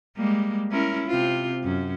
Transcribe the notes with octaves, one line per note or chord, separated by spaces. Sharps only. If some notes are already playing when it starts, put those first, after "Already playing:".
G3 G#3 A#3
C#4 E4 A#4
C3 C4 F4
F#2 C#4